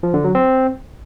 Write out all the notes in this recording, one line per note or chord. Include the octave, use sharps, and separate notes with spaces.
F3
D3
F#3
C4